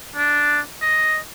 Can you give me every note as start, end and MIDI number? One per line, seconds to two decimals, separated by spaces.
0.16 0.60 62
0.82 1.18 75